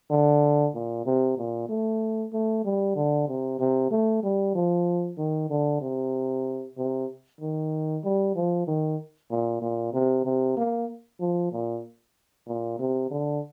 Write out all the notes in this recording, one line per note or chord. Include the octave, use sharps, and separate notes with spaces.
D3
A#2
C3
A#2
A3
A3
G3
D3
C3
C3
A3
G3
F3
D#3
D3
C3
C3
D#3
G3
F3
D#3
A#2
A#2
C3
C3
A#3
F3
A#2
A#2
C3
D3